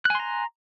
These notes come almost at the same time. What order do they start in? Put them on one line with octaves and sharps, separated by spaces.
F#6 G#5 C6 A#5